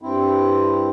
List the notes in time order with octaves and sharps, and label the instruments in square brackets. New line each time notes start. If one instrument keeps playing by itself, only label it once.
[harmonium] G2 C4 E4